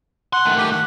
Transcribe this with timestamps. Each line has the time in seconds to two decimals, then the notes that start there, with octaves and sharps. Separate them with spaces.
0.33 F#5 C6
0.45 D#3 A3
0.57 G4
0.71 F#5